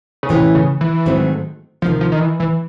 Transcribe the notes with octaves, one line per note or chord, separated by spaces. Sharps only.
C#3
A2 C3 E3 A3 C#4
C#3
E3
G#2 D#3 F#3 A3 C4
D2 C3 D#3 F3
F3
D#3
E3
E3